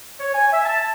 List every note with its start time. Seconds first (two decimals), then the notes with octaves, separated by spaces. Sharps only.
0.20 C#5
0.34 G#5
0.52 E5
0.65 A5